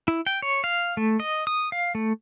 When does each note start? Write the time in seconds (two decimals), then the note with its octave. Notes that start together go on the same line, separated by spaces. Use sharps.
0.08 E4
0.26 G5
0.42 C#5
0.64 F5
0.97 A3
1.20 D#5
1.47 D#6
1.72 F5
1.95 A3